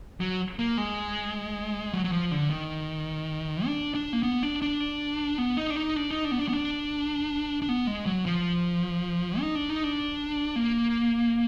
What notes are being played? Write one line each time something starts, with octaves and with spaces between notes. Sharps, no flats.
F#3
A#3
G#3
F#3
F#3
F3
D3
D#3
D4
D4
A#3
B3
D4
D4
B3
D#4
D4
D#4
D4
D#4
D4
B3
D4
B3
D4
D4
B3
G#3
F#3
F3
D#4
D4
D#4
D4
A#3